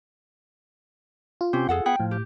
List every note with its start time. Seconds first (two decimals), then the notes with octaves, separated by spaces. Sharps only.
1.41 F4
1.53 C3 C4 C#4 G4
1.69 F2 G#4 A4 F#5
1.86 B3 G#4 F#5 G5
2.00 A2 F3
2.11 G4